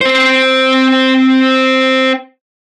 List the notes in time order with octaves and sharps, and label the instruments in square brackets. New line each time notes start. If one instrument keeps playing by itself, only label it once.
[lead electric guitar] C4 C5